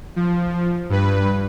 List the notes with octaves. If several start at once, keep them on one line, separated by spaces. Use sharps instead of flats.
F3
G2 B4